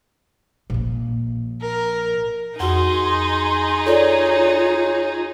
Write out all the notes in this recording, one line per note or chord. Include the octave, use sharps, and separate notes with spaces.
A#1 A#2
A#4
F2 D#4 F#4 G#4 C6
F4 A4 C#5 D5